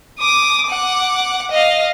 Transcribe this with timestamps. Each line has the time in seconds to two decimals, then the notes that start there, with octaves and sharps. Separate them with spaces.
0.19 D6 D#6
0.67 F#5 D6
1.51 D#5 F5